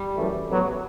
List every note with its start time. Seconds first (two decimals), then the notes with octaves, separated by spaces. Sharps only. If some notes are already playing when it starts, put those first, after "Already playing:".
Already playing: G3
0.14 F#2 E3 A3
0.48 A1 A2 F#3 B3